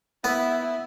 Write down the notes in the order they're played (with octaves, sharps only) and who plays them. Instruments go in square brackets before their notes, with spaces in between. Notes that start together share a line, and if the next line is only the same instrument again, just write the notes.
[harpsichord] B3 [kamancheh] E4 E5